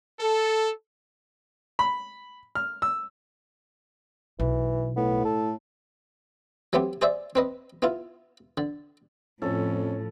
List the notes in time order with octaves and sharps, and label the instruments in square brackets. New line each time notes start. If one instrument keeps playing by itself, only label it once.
[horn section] A4
[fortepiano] B5
F6
E6
[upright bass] B1 [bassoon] E3
[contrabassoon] A2 [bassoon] B3
[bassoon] A4
[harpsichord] F#3 A3 B3 C4 G4
G#4 C5 D5 E5
C4 B4 D#5
B3 E4 F4
D3
[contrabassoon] F2 [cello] A2 F3 [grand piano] C#4 [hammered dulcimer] A4